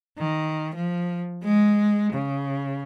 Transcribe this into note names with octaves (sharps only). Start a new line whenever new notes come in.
D#3
F3
G#3
C#3